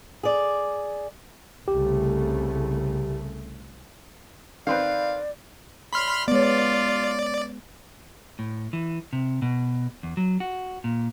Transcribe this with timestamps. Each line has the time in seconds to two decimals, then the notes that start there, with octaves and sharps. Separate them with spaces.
0.23 G#4 D5
1.68 C2 C#3 A3 G4
4.67 D#3 C4 B4 D5 F5
5.93 G4 D5 E5 B5 C6 F6
6.28 F#3 G#3 B3 C#4 F4 D5
8.39 A2
8.73 E3
9.13 C3
9.42 B2
10.03 E2
10.17 F#3
10.40 F#4
10.84 A#2